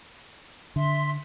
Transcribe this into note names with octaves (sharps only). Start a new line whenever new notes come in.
D3 E5 C6